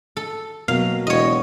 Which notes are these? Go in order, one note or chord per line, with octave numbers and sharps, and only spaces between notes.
A4
B2 F#3 A#3 F5
E1 C#5 D#5